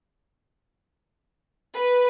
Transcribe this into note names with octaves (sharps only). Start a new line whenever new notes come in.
B4